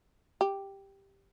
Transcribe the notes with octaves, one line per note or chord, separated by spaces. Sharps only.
G4